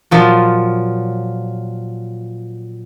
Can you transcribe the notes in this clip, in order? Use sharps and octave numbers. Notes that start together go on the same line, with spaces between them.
A#2 F3 F#3